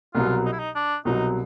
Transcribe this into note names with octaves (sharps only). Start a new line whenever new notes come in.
C2 B2 F#3 F4
D#4
E4
D#4
D4
C2 B2 F#3 D#4